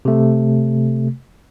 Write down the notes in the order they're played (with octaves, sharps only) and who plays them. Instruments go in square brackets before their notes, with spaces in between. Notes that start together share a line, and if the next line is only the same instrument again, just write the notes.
[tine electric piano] C3 A3